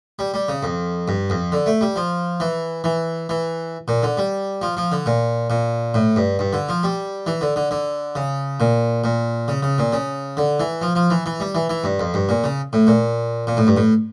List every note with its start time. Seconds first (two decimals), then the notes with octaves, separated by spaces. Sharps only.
0.19 G3
0.34 G3
0.49 C#3
0.63 F2
1.08 G2
1.30 F2
1.52 D3
1.66 A3
1.81 G3
1.96 F3
2.40 E3
2.84 E3
3.29 E3
3.88 A#2
4.03 D3
4.17 G3
4.62 F3
4.77 F3
4.92 D3
5.06 A#2
5.50 A#2
5.94 A2
6.16 G2
6.39 G2
6.53 D3
6.69 F3
6.83 G3
7.27 E3
7.41 D3
7.56 D3
7.71 D3
8.15 C#3
8.60 A#2
9.04 A#2
9.48 C#3
9.63 C#3
9.78 A#2
9.93 C#3
10.37 D3
10.60 E3
10.81 F3
10.95 F3
11.10 E3
11.26 E3
11.40 G3
11.55 E3
11.70 E3
11.84 G2
12.00 F2
12.14 G2
12.29 A#2
12.44 C#3
12.73 A2
12.87 A#2
13.47 A#2
13.57 A2
13.67 G2
13.77 A2